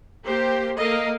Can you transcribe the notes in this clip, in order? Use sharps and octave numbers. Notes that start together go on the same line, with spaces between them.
A#3 G4 C5
A#3 A4 A#4 D#5 F5